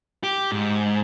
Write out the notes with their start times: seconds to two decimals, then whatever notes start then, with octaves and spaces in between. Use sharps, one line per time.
0.23 G4
0.52 G#2